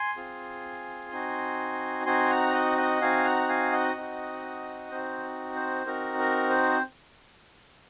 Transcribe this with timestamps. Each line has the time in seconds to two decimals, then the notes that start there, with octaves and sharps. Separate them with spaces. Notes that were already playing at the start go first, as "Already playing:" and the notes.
Already playing: G#5 C6
0.16 C4 F4 G#4
1.12 C4 D#4 F#4
2.06 C4 D#4 F#4 G#5 C6
2.30 F#5 A#5
2.53 D#5 F#5
2.78 D#5 F#5
3.01 C4 D#4 F#4 F5 G#5
3.25 F#5 A#5
3.49 F5 G#5
3.72 D#5 F#5
3.97 C4 D#4 F#4
4.91 C4 D#4 F#4 C5
5.55 C5
5.86 C4 D#4 F#4 A#4
6.19 A#4
6.49 C5